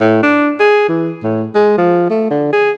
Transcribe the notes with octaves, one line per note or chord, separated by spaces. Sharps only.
A2
D4
G#4
E3
A2
G#3
F3
A3
D3
G#4